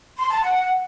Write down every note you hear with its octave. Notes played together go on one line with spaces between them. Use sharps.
C6
A5
F#5